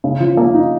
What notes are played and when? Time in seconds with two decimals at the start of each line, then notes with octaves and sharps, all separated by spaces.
0.04 C#3
0.20 F3
0.37 A#3
0.54 D#4